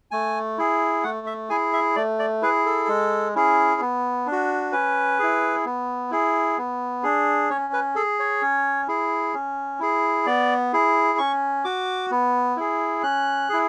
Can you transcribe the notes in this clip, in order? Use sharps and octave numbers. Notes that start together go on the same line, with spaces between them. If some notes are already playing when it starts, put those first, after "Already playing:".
A3 G#5
E4 G#4
A3 F#5
E5
E4 G#4 G#5
E5
A3 D5
D5
E4 G#4 B4
A4
G#3
C#4 E4 G#4
B3
D4
F#4
C#4 B4
E4 G#4
B3
E4 G#4
B3
D4 G#4
C#4 C#5
B4
G#4 A4
C#5
C#4
E4 G#4
C#4
E4 G#4
B3 D5
E4 G#4
C#4 C#6
F#4 D6
B3
E4 G#4
C#4 F#6
E4 G#4